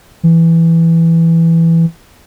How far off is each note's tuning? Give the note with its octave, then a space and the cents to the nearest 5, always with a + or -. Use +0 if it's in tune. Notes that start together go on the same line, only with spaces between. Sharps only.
E3 +5